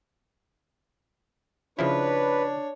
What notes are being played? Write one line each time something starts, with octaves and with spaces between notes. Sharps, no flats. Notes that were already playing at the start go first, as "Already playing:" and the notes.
C#3 F3 D4 E4 B4 C#5